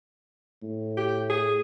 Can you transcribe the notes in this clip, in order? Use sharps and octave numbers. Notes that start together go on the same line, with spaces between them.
A2
G4
G#4